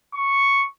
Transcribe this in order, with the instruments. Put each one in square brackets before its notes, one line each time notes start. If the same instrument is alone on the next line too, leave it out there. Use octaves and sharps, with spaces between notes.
[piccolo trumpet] C#6